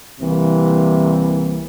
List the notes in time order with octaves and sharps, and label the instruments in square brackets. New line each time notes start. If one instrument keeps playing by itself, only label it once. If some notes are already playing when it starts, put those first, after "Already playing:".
[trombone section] C2 C3 E3 A#3